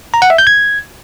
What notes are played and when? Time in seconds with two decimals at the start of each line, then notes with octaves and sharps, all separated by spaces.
0.14 A#5
0.22 F#5
0.30 E5
0.38 G6
0.47 G#6